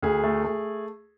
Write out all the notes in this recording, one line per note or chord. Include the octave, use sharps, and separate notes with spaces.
D2 G#4
A3
A3